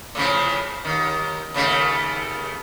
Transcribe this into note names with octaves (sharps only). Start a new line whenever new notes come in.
A2 C#3 F3
D#2 D#3
D#2 C#3 A3